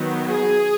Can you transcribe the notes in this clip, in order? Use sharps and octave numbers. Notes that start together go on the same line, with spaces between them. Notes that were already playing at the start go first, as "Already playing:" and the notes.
Already playing: D#3 F#3 B3
G#4